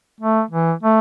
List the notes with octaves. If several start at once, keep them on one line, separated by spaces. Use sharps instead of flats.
A3
E3
A3